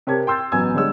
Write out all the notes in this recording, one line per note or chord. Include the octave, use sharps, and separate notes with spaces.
C3 G4 A#4 C#5 A5 G#6
G5 C6 E6 G6 A6
A1 F#3 B3 G#5 E6 G#6
D3 G3 G#3 C#5 E6